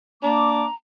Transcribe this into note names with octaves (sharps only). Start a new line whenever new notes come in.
A#3 D4 A#5 D6